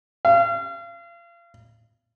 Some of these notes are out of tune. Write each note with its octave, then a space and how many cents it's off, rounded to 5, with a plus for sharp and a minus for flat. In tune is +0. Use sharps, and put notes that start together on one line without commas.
F5 -35